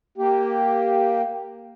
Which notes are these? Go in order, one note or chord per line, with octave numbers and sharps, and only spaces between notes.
A#3 G4